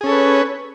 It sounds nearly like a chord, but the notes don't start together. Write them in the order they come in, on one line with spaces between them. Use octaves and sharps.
G#4 C#4 A4 C#5 B4